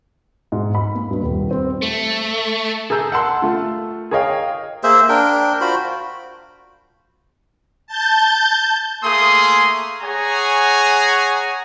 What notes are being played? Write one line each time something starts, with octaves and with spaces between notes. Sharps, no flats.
G#2
B5
A#3
G2
D#1
C4
A3
G#4 A4 A#5 E6 G6
F#5 A5 C6 E6
A3 F4
G#4 A#4 C#5 D#5 F5 G5
A#3 G#4 C5 E5
D4 A#4 G5
F4 F#4 C5 B5
A5 G6
A3 A#3 G#4 C6 D#6
G#4 C#5 F#5 G#5 A#5